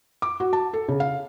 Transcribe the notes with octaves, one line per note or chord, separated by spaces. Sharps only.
D6
F#4
A5
A4
C#3
F5